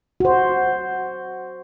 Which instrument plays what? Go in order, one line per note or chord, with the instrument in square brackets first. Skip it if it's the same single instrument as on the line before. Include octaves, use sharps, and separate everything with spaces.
[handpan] F#4 C5